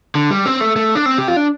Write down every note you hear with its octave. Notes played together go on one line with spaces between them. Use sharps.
D3
G3
C4
A3
A3
D4
C4
G4
F4
D4